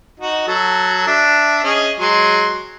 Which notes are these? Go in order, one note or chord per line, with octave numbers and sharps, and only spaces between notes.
D#4 F#4
F#3 A4
D4 E5
C#4 G#4 D#5
F#3 G#3 C6